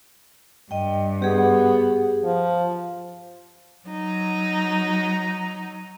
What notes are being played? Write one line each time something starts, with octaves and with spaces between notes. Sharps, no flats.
G2 D#5 G5
B3 G4 G#4
F3
F#3 D#4